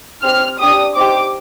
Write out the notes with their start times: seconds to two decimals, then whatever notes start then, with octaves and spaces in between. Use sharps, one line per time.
0.23 C4 G4 F6
0.59 D4 G4 D#6
0.95 C4 D#4 G4 D6